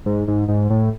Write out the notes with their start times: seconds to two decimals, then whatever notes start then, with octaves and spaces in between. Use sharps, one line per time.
0.06 G#2
0.28 G#2
0.48 G#2
0.70 A2